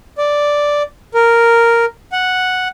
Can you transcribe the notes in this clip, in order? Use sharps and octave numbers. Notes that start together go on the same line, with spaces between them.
D5
A#4
F#5